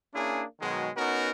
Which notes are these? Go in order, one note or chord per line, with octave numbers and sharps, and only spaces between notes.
A#3 C#4 D4 E4 G#4
B2 D#3 F#3 G#3
B3 C#4 D#4 F#4 A#4